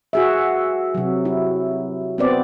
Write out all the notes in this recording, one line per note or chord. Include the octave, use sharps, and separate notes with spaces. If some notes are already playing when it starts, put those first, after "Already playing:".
F#4 G#4 E5
C3 F#3
E4
B3 C4 D5